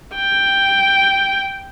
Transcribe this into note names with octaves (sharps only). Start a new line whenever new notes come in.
G5